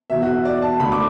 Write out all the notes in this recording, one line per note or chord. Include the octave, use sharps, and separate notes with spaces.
E2 B2 F#3 E5
F#4
D5
A5
D2 D3 A3 B5
D6